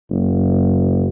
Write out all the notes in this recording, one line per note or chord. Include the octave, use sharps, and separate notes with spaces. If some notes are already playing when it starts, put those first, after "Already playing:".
F#1